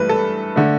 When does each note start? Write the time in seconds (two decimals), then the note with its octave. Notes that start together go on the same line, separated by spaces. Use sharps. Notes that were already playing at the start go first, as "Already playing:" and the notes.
Already playing: G2 E3 A3 B4
0.09 A4
0.56 D3 A3